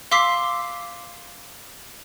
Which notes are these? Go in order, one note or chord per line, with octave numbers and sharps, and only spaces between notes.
F5 C6 D6 E6 B6 C7